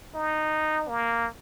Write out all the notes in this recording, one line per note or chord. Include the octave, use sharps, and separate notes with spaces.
D#4
A#3